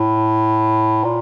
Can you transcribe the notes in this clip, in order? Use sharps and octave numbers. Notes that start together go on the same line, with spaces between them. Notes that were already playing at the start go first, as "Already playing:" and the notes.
Already playing: A2
A#2